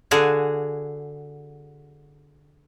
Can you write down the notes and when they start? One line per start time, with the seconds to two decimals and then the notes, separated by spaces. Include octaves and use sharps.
0.11 D3 F#4 G#4 F5 G#5